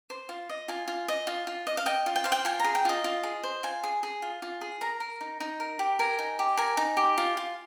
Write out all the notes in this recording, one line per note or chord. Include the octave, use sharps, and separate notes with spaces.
C5
F4
D#5
F4 G#5
F4
D#5
F4
F4
D#5
F5
D#5 G5
F4
G5
C5 F5
G5
F4 G#5
G#4 A#5
G5
F4 D#5
F4
G#4
C5
F4 G#5
G#4
G#4
F4
F4
G#4
A#4 A#5
A#4
D#4
D#4
A#4
G4
A#4 G#5
D#4
G4
A#4 G#5
D#4
G4
F4
F4